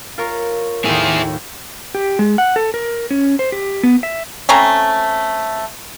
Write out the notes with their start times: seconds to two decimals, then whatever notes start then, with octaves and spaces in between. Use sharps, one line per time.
0.18 F4 A#4 C#5
0.85 D#2 A2 E4 G#4
1.95 G4
2.19 G#3
2.38 F#5
2.56 A4
2.74 A#4
3.11 C#4
3.39 C5
3.52 G4
3.83 B3
4.03 E5
4.49 A3 C4 C#4 A#5